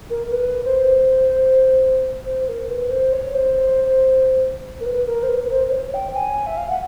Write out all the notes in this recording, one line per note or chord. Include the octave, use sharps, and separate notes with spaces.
A#4
A#4
B4
C5
C5
A#4
B4
C5
C#5
C5
A#4
B4
A#4
C5
B4
B4
C5
C5
C#5
G5
G#5
E5
F5
F#5